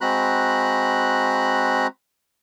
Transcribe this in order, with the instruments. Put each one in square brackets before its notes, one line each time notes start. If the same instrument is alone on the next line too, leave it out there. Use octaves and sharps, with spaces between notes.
[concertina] G#3 C4 F#4 A#5 B5 F#6